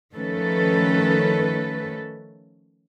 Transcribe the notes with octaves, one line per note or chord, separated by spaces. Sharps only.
D#3 F3 A3 C#4 A4 B4